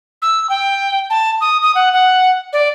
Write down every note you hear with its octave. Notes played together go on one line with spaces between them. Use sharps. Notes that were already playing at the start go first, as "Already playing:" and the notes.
E6
G5
A5
D#6
D#6
F#5
F#5
D5